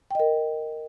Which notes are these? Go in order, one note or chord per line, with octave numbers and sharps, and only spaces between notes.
A#4 D#5 G5